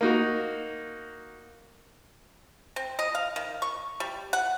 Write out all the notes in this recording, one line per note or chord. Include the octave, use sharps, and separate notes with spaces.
A#3 D#4 F#4
C4
D#5
F5
D#3
C#6
G3
F#5